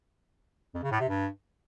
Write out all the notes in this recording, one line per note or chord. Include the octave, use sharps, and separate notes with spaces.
F2
C#3
A2
C3
G2